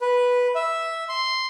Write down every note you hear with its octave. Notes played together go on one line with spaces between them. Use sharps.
B4
E5
C6